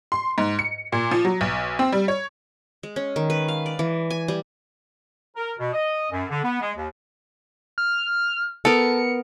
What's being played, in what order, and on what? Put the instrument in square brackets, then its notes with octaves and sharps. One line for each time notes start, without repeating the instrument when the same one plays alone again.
[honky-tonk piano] C6
G#2
C#7
A#2
F3
F#3
B1
C4
G3
C#5
[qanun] G#3
C#4
D#3
B4
F5
D5
E3
G#5
G3
[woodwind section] A#4
B2
D#5
F#2
D3
B3
G#3
D#2
[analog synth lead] F6
[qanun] B3 A#4 [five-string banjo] A4 [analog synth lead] C#7